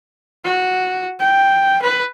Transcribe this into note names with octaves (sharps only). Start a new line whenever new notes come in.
F#4
G5
B4